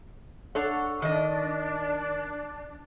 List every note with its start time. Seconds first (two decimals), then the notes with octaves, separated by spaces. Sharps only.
0.55 D4 A4 C#5 F#5
1.02 D#3 D4 D#5